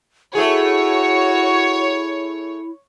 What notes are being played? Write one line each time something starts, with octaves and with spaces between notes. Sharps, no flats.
A3 E4 F#4 G#4 C#5